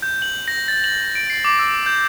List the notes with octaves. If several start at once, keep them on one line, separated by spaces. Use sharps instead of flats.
G6
F#7
A#6
A6
F#7
D7
C7
D6
E6
G6